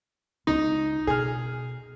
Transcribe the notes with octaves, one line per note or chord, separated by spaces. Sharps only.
C#2 D#4
B2 G#4 F6